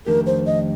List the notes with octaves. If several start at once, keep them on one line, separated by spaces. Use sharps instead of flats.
F2 D#3 A3 D4 G4 A#4
C5
D#5